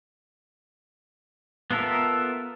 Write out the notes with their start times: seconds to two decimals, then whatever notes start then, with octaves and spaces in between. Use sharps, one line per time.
1.71 B3 F4 A4 A#4 E5